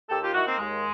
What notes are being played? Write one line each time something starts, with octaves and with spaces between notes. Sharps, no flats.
D#2 G4 A4
F4 G4
D#3 E4 F#4
A#3 C4
D#2 G#3